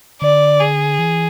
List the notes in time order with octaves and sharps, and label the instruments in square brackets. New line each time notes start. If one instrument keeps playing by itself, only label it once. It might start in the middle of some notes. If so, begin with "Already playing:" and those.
[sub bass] D3 [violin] D5
[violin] G#4
[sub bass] E3